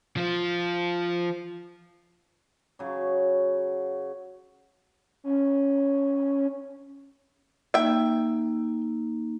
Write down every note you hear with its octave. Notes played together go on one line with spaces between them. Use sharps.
F3 F4
C#3 F#3
C#4
A#3 D#4 E5 G5